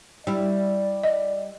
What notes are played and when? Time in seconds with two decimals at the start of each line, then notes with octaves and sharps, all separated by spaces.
0.27 G3 E4 D5
1.03 D#5